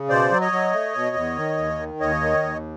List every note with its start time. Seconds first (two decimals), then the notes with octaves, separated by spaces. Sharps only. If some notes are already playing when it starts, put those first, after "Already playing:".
Already playing: C#3
0.09 B2 C5 D5
0.31 F#3
0.41 C#5 D#5
0.52 F#3
0.73 A3
0.95 B2
1.16 E2
1.36 D#3
1.58 D#2
1.79 D#3
2.00 D#2 C#5 D#5
2.21 D#3
2.43 D#2